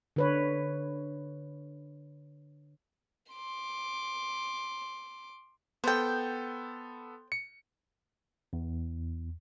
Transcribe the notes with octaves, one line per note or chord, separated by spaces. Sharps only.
D3 B4 C#5
C6 D6
B3 A4 C5 G5
C#7
E2